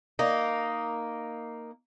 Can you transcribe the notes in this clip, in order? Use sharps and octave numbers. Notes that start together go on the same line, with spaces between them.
A#3 D#4